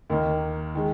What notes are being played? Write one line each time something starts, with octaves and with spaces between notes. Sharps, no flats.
D#2 D#3 A#3
D#3 G#3